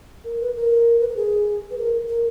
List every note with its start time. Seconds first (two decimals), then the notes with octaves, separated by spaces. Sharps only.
0.25 A#4
0.40 B4
0.55 A#4
1.00 B4
1.09 A#4
1.16 G#4
1.71 B4
1.78 A#4
2.09 A#4